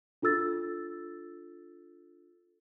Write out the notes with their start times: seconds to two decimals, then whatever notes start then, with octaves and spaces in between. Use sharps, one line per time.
0.22 D4 F4 A4 E6 A6